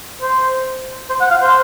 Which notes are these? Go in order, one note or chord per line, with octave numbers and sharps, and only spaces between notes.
C5
C5
F#5
F5
C5